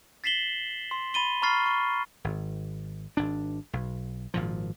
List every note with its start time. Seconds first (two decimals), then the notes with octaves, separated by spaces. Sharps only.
0.24 A6 B6 C7 E7 F#7 G7
0.91 C6
1.14 B5 A6 D#7 G7
1.42 A#5 B5 C#6 F6 A6 C7
1.66 C#6
2.24 G#1
3.17 G#1 D4
3.73 B1
4.34 G#1 A#2 F3